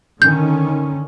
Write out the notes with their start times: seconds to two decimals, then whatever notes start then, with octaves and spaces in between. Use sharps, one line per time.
0.22 D3 D#3 C#4 G6